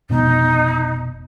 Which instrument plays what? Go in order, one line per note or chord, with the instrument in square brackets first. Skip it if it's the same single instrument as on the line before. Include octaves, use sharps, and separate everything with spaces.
[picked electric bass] F1 B2 [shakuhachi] D#4